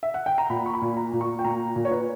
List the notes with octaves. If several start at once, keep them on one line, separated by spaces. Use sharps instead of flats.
E5
F#5
G5
A#5
A#2 B5
C#6
B5
A#2
A#5
A#2
C#6
G5
A#2 A#5
A#2
C#5
B4